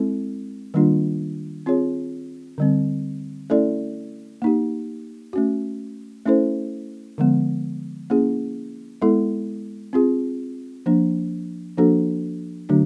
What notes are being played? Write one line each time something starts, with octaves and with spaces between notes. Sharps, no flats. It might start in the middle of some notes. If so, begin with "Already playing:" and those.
Already playing: G#3 C4 E4 A4
D#3 G3 A#3 D4 F4
C4 F4 G#4 C#5
D3 G3 C4
A3 C#4 E4 A4 D5
A#3 D#4 G4
A3 C#4 F#4
A3 C#4 E4 A4 C5
D3 F3 G#3 B3
A#3 C#4 E4 G#4
G#3 B3 E4 A4
C4 F4 G#4
F3 A#3 D4
F3 A#3 D4 F#4 A4
D3 F#3 A3 D4 F#4